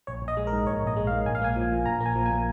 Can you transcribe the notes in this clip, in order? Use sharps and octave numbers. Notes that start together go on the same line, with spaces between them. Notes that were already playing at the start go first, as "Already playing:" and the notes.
A#1 C#5
A#1
D#5
G#3
A#4
G#2
A#1 C#5
A#1 D#5
G#3
F5
G#2
A#1 G#5
F5
A#3 G#5
F3
A#2
A#1 A#5
A#3
G#5
F3
G#5
A#2